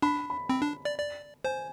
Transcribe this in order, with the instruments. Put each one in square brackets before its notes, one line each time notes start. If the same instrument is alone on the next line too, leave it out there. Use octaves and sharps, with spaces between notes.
[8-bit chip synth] D4 [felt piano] B5
[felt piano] B5
[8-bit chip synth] C4 [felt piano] B5
[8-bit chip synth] D4
D5
D5
[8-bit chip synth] C5 [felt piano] G#5